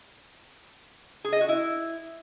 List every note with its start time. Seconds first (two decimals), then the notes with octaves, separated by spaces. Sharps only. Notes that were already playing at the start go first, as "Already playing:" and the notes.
1.24 G#4
1.32 D#5
1.41 F#4
1.49 E4